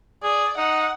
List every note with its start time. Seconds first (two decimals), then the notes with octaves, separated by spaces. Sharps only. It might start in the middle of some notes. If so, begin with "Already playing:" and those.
0.23 G#4 D5
0.58 D#4 F#5